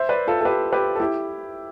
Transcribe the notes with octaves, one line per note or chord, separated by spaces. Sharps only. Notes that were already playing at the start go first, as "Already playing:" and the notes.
Already playing: C5 E5
B4 D5
F4 A4
A4
G4 B4
G4 B4
A4
E4 G4